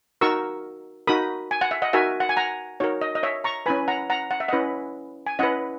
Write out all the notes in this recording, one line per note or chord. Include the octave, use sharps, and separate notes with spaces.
D#4 F#4 A#4 C#6 E6
D#4 F#4 A#4 B5 D#6
G#5
F#5
E5
D#5 F#5
D#4 F#4 A#4 E5 G#5
F#5
G#5
F#5 A#5
D#4 F#4 A#4 C#5
D#5
D#5
C#5 E5
A#5 C#6
C#4 E4 B4 G#5 B5
F#5 A#5
F#5 A#5
F#5
E5
C#4 E4 B4 D#5 F#5
G#5
C#4 E4 B4 D#5 F#5